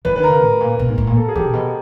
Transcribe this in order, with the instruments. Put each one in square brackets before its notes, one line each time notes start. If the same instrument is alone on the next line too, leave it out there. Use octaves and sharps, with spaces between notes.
[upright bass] E3 [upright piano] B4
[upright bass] D#3 [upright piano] B4
[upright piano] A#4
[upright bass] C#3
A2
A#2
B2
G#2
A2
A#2
[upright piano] A4
G#4
[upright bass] E3 [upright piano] G4
[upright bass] A#2
B2